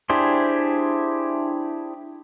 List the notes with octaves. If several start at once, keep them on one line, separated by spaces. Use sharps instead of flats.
D4 E4 G4 G#4 C5